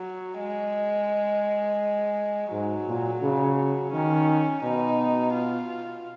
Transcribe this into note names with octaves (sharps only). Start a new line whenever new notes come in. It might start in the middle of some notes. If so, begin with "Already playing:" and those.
Already playing: F#3
G#3
G#2 F#3
A#2
C#3
D#3 C#4
B2 D#4
F4